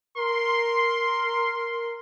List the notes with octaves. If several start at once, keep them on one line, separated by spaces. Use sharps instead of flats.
A#4 C6